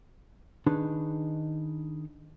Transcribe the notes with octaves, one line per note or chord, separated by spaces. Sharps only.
D#3 D4 D#4 G#4 B4